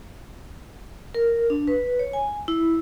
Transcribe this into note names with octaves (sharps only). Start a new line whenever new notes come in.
A#4
D4
B4
C#5
G#5
E4